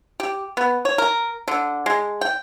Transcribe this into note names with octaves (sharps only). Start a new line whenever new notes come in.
G4
B3
C#5
A#4
D3
G#3
G5